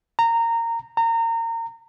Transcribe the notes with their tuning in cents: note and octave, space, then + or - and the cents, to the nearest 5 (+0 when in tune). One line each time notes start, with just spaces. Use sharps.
A#5 -20
A#5 -30